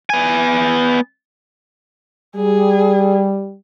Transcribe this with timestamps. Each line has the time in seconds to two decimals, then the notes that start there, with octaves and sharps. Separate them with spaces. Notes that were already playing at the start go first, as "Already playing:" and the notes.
0.10 B3 G#5
2.36 G3 G#4